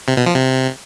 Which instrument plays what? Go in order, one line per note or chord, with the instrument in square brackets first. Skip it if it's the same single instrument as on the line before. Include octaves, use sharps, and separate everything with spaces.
[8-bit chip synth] C3
B2
F3
C3